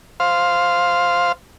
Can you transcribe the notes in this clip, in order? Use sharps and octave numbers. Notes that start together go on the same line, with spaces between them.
C5 F5